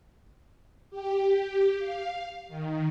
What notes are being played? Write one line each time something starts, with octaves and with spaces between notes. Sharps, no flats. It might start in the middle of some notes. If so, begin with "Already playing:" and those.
G4
F5
D#3